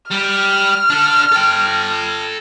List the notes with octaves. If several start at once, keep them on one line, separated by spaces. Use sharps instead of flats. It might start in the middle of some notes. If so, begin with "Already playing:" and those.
G3 G4 F6
D4 A4
A4 G5